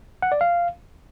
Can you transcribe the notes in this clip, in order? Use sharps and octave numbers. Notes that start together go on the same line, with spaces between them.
F#5
D5
F5